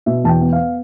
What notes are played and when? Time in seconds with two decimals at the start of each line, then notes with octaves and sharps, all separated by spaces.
0.06 B2 E5
0.24 E2 A5
0.29 G5
0.41 B3
0.53 F5